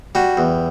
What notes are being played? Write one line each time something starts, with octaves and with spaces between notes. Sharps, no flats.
G3 F#4
E2